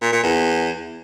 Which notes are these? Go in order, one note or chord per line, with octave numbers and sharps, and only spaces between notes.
A#2
A#2
E2